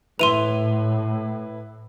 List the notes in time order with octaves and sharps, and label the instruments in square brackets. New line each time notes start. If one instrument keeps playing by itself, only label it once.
[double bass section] A2 [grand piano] E4 B4 [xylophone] C6 D#7 F7